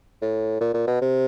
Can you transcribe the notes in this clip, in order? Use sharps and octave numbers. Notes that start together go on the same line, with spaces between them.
A2
A#2
A#2
B2
C3